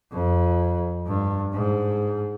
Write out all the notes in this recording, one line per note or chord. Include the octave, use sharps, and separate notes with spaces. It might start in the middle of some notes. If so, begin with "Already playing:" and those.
F2
G2
G#2